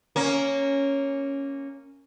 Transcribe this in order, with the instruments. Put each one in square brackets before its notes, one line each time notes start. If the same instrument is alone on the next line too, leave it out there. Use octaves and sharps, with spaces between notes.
[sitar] A#3 C#4